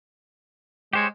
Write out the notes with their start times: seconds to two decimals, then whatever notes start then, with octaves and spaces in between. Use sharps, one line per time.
0.93 G#3 G4 C5 C#5